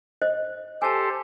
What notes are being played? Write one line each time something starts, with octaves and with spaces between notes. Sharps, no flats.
C5 D#5
G4 A4 C5 G#5 A5